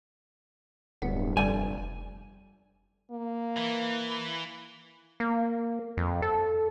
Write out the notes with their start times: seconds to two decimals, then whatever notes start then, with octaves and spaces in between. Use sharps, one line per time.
1.02 D1 G2 B3
1.37 F1 D3 G3 G#5
3.11 A#3
3.57 E3
5.20 A#3
5.97 F2
6.22 A4